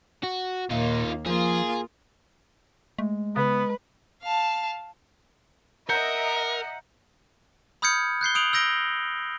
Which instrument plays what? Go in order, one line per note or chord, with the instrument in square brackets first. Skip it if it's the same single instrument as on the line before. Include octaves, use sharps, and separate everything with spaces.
[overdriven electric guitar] F#4
[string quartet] D#2 A#3 [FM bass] A#2 [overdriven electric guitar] D#4 F4
[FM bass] F3 [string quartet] A#3 F4 D#6 [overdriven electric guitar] G#4
[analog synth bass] G#3 [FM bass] A3
[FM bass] C#3 [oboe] B3 [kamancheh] B4
[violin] F5 A5
[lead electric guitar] A#4 [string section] D#5 E5 [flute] F#5 [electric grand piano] A#5 G6 C#7
[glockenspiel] B5 D#6 F6 G6 G#6 C#7
F#6 G6 C7 G7
D#6 D7 F7 F#7
E6 G6 A#6 D7 G7